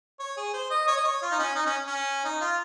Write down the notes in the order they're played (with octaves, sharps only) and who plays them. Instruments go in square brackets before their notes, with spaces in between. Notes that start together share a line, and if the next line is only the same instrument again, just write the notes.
[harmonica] C#5
G#4
C5
D#5
C#5
D#5
C#5
F4
D#4
C#4
D#4
C#4
C#4
D#4
F4